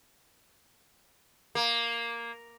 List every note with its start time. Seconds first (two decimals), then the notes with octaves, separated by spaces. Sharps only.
1.55 A#3